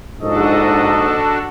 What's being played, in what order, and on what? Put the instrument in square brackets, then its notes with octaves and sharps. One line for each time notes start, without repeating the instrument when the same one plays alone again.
[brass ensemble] A#1 G#2 D#5 [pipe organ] D4 F#4 A4